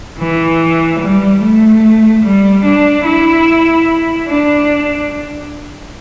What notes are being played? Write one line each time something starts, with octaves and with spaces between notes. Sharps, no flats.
E3
G3
A3
G3
D4
E4
D4